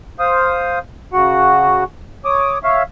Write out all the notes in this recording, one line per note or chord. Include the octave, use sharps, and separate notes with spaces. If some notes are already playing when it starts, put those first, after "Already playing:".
C5 F5 D#6
C#3 F#4 F#5
C#5 D6 D#6
C#5 E5 F5